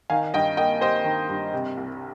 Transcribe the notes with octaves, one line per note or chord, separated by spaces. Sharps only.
D#3 F5 G#5
G2 D#5 G5
A#3 D#5 G5
G3 C5 D#5
D#3
G2
C3
C2